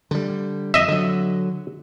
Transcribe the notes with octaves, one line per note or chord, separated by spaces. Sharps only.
D3 G3
F2 D#5 E5
D3 F#3